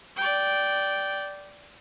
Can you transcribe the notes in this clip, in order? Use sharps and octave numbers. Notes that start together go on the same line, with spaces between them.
D5 G5